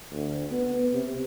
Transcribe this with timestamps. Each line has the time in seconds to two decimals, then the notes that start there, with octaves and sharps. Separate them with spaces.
0.11 D2
0.51 B3
0.93 C3